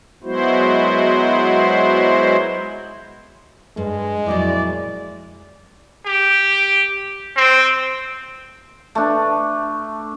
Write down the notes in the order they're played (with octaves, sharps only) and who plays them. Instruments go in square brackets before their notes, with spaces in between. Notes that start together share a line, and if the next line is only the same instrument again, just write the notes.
[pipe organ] F#3 G#3 B3 E4 F#4 C5
[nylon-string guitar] G2 [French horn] G#3
[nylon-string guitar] F2 A#2 F#3 [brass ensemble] E4 D5
[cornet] G4
C4
[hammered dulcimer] A3 D4